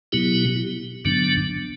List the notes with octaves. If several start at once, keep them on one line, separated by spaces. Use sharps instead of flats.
B2 F#3 B3 E4 G4
G2 D3 F#3 B3 D4